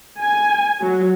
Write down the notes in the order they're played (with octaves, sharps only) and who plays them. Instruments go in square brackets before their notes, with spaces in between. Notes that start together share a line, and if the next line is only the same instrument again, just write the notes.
[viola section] G#5
F#3